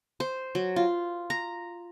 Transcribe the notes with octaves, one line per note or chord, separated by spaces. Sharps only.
C5
F#3
F4
A#5